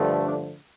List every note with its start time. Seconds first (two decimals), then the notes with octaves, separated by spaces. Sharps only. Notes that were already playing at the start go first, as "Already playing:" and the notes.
Already playing: G2 D3 F3 A3
0.22 D4